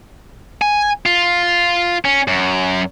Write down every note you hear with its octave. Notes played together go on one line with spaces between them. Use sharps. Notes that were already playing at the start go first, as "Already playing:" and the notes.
G#5
F4
C#4
F#2